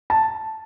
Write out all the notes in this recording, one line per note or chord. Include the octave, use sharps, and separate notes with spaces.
A5